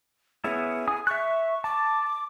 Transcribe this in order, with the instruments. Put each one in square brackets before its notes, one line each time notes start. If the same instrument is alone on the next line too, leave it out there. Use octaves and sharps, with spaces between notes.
[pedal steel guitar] B3 C#4 E4 [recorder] G#4
[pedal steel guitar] G#5 D#6
[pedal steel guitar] E5 F#6 [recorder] C#6
[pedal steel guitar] A5 [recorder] D6